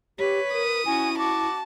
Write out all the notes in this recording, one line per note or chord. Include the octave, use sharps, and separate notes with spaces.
G4 B4 C#5
A#4 D#6
C#4 E4 F#4 G#5
F#4 A5 D6